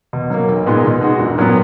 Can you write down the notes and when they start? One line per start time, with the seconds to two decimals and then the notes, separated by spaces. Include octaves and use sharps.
0.13 B2
0.30 F#3 A#3
0.49 B1
0.66 A#2 G#3 B3 D#4
0.84 B2
1.01 G#3 D#4 F#4
1.19 A#1
1.38 A#2 F#3 B3